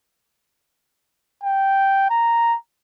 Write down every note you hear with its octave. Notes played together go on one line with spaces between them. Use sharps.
G5
A#5